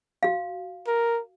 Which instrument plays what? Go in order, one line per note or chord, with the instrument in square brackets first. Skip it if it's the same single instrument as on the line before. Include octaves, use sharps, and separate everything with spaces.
[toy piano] F#4 F5
[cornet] A#4